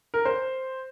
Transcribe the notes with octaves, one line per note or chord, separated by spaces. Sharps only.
A#4
C5